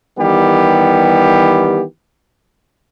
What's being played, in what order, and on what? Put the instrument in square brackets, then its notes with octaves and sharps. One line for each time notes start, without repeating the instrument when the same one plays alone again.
[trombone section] D#3 E3 G3 B3 G4